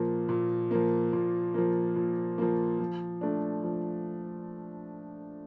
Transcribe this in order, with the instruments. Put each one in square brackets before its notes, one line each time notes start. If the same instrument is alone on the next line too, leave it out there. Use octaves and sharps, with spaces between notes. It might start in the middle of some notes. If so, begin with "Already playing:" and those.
Already playing: [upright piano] A#2 F3 A#3
A#2
F3 A#3
A#2
F3 A#3
A#2
F3 A#3
F3
A3 D4
F3